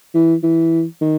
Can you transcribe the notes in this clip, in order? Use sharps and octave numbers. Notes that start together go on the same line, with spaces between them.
E3
E3
D#3